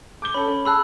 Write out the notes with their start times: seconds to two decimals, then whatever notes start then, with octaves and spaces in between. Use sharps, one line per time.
0.22 D6 G6 G7
0.34 C#4 A4 B5
0.48 C#4
0.65 G#4 A5 B5 E6 F#6